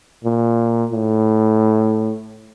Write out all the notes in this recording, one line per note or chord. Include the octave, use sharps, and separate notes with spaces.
A#2
A2